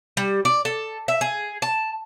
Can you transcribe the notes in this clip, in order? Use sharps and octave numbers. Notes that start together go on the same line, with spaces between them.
G3
D5
A4
E5
G#4
A5